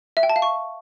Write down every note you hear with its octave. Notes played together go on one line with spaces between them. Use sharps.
E5
G5
A5
F5
C#6